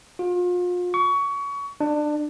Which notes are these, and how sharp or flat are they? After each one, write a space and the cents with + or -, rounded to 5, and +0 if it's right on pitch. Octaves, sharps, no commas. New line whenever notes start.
F4 +35
C#6 +25
D4 +25